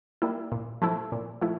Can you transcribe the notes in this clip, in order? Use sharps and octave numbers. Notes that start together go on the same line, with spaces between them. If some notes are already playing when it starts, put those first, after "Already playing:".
G3 A#3 E4
A#2
F3 A3 E4
A#2
F3 A3 E4